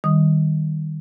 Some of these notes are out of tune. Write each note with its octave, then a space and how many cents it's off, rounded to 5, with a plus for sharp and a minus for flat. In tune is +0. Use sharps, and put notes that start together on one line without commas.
D#3 +0 G3 +0 D#6 +0